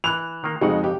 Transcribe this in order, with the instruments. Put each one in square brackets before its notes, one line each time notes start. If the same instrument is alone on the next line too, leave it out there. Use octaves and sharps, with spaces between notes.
[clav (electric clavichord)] E3 [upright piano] F#6 F7
[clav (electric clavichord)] D#3 A#3
[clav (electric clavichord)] F2 C#3 F#5 [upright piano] G#3 D#4 F#4
[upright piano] G4